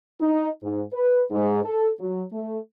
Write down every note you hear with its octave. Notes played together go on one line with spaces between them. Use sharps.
D#4
G#2
B4
G#2
A4
F#3
A3